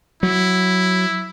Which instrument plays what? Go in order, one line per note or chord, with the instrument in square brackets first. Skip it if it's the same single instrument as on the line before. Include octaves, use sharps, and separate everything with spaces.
[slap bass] F#3 [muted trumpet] E4